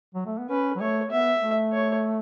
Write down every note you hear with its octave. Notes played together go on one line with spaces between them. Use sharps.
F#3
A3
B3
C#4 B4
F#3
A3 C#5
B3 E5
A3
C#5